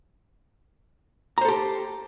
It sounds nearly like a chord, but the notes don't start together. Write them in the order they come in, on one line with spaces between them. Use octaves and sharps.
A#5 C5 A4 G4